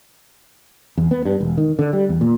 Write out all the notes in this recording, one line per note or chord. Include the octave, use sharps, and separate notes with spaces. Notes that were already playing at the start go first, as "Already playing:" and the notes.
E2
B3
G2
E1
D#3
D3
G3
E2
A#2